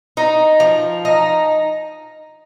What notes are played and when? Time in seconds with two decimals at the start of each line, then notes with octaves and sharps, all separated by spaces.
0.17 D#4
0.60 F3
1.05 D#4